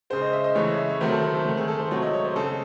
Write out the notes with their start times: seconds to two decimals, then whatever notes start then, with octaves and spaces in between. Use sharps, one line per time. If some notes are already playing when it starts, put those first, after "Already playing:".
0.10 C#3 G#3 C5
0.22 D#5
0.33 E5
0.44 D#5
0.55 C#3 E3 A3 C#5
0.67 D#5
0.78 E5
0.90 C#5
1.00 C3 D#3 F#3 A3 C5
1.12 A4
1.23 C5
1.35 A4
1.46 D#3 A3
1.57 G#4
1.68 A4
1.79 C5
1.91 C3 F#3 A3 C#5
2.02 D#5
2.13 C#5
2.25 C5
2.36 C#3 G#3 A4